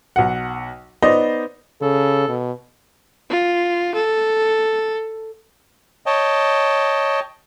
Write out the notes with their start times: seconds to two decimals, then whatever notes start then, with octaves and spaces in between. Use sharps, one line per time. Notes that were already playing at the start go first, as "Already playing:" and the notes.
0.16 B1 F#5
1.02 B3 D#4 C5 D5 D#5
1.82 C#3 A4
2.28 B2
3.30 F4
3.95 A4
6.06 C#5 D#5 G5 A5